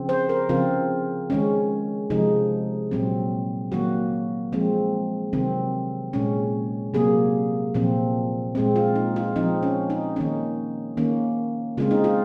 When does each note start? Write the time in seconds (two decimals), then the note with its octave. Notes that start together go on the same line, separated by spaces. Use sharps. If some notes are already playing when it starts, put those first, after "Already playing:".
Already playing: C#3 F3 C4
0.09 C5
0.29 A#4
0.49 C#3 F3 C4 F4
1.30 D#3 G#3 C#4
2.10 C3 F3 G#3 D#4
2.91 A#2 F#3 C4
3.71 D#3 F#3 A#3 F#4
4.52 F3 G#3 C4
5.33 C3 D#3 F#3 C4
6.13 A#2 G#3 C#4
6.94 C3 F#3 A#3 G#4
7.74 A#2 F3 C4
8.55 A#2 G#3 C4
8.76 F4
8.95 D#4
9.16 F4
9.36 F3 G#3 C4 D#4
9.63 C#4
9.90 D#4
10.16 D#3 A#3 C#4 D#4
10.97 D#3 A#3 C#4
11.77 C#3 G#3 C4 F4
11.91 D#4
12.04 F4